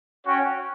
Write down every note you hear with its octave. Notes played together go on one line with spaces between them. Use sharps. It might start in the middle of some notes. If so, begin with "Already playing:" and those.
C#4 F#4 C#5 G5